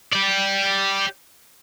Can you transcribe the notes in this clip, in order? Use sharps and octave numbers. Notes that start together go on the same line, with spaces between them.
G4 D5